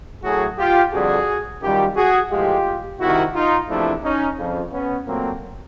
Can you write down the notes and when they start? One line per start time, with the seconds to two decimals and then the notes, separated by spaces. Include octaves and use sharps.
0.24 A2 F#3 A3 F#4 G#4
0.59 F4 G4
0.93 F2 D3 G3 F#4 G#4
1.62 F#2 D#3 G3 F4 G4
1.96 F#4 G#4
2.31 A2 F3 G#3 F4 G4
3.00 C2 C3 D#3 E4 F#4
3.34 D#4 F4
3.69 E2 C3 F3 A3 D4 E4
4.04 C#4 D#4
4.38 F2 C#3 F3
4.73 B3 C#4
5.07 A#2 F#3 A3 A#3 C4